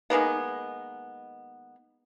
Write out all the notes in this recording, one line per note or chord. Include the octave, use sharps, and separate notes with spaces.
D#3 G#3 A#3 B3